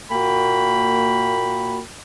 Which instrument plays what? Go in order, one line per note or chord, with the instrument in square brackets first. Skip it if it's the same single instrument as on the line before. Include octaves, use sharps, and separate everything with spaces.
[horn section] A#2 A#3 F#4 G5 B5